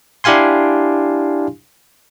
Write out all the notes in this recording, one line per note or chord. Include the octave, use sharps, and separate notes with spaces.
D4 E4 G4 F5 G#5 C6